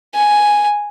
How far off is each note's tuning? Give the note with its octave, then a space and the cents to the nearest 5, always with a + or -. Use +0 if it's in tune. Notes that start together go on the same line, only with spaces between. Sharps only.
G#5 +0